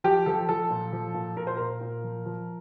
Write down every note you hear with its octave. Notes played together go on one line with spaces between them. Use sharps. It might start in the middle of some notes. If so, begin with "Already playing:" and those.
F3 G4
F3 A4
F3 A4
A#2
F3
A#2
A#2 A#4
C5
A#2 A#4
A#2
F3
F3